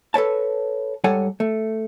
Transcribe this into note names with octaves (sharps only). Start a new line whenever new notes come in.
A4 B4 C#5 A5
G#2 G3 A4 C#5 F#5 G#5
A3